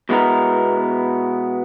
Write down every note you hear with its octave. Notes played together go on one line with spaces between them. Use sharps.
B2 G#3 B3 E4 A#4